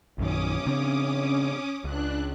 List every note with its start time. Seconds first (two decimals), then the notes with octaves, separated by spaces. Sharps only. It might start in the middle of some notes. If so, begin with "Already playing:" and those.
0.18 A#1 F#2 D#3 C#4 D6 D#6
0.66 C#3 C4 D4
1.84 C#2 D4 F#6